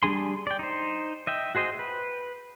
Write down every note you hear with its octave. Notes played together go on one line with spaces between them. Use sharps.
G3 D4 G#4 G#5 C6
D5 G5
D#4 C5
D#5 E5 G5
F#4 G#4 C5 D#5 G5
B4